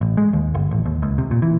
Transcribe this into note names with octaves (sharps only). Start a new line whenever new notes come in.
A1
G#3
D#2
G1
A1
D#2
C#2
C3
A#2
E3